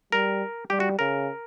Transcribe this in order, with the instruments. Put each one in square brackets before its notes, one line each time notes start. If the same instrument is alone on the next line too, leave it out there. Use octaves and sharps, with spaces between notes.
[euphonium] G3 [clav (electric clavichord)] A#4
[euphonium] G3 [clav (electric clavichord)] G4
[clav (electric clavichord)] F#4
[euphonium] C#3 [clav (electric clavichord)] A#4